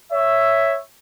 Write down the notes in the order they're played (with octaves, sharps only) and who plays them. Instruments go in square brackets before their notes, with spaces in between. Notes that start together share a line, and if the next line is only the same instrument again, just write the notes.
[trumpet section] C#5 E5